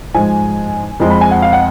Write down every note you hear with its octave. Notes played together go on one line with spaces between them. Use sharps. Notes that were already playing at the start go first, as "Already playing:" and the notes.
G#2 F3 G#3 G#5
F2 F3 G#3
B5
G#5
F#5
F5
F#5